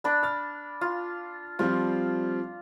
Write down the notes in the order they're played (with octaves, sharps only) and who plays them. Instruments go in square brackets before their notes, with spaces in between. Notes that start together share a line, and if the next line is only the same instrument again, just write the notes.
[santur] D4 B5
[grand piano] F6 A6
[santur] F4
[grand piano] F3 G3 C4 [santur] F4